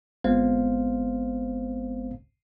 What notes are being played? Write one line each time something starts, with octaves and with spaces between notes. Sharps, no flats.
G1 G#3 B3 C4 C5 F5